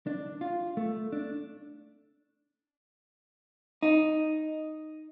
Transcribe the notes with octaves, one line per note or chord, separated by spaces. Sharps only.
D4
F4
A3
D4
D#4